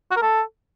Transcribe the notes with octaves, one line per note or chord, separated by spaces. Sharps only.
F#4
A#4
A4